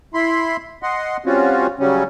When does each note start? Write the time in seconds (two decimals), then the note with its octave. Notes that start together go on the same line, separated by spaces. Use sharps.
0.14 E4 B5 C6
0.83 D#5 F#5 C6
1.26 G3 C4 C#4 F4 F#4
1.80 C#3 F#3 G3 C#4